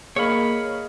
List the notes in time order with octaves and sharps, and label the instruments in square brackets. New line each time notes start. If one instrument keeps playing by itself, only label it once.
[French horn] A#3 [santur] G#4 D#5 F5 [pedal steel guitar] C#5 B5